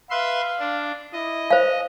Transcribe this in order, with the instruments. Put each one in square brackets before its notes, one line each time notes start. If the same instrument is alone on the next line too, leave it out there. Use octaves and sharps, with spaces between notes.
[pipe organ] B4 E5 C6 [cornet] F5
[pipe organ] D4
[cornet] E4 [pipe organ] D#5
[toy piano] C5 F5